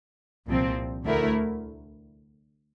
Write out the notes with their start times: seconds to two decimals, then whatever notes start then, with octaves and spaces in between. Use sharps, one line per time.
0.47 C2 A#2 F3 C4
1.06 D2 D3 A3 E4 A#4